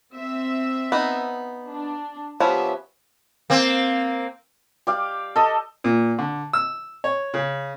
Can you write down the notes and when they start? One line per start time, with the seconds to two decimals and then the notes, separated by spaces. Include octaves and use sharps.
0.14 C4 E5
0.92 B3 D#4
1.68 D4
2.40 F3 B3 C#4 G4 E5
3.50 A#3 C4
4.87 G4 D5 F5
5.36 A4 D#5
5.84 A#2
6.18 D3
6.53 E6
7.04 C#5
7.34 C#3